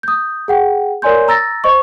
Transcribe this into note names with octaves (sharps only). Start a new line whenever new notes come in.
D#6 G6
G#4 F#5 G5
A#4 C#5 D5 G#5 C6 G6
A#5 E6 A6 A#6
C5 D#5 C#6